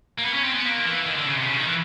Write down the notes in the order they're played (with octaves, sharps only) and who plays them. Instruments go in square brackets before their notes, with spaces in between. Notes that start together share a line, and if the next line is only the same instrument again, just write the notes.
[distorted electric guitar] A#3
B3
C#4
C4
B3
A#3
D#3
E3
D#3
D3
C#3
C3
C#3
D3
D#3
E3